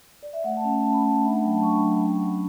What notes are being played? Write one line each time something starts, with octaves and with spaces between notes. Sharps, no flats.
D5
E5
A3 F#5
A5
C#4
C#4 A5
B5
A3 A5
F#5
D4 E5
F#5
F#3 G5
A5
D4 C#6
B5
F#3 A5
B5
C#4 C#6
C#4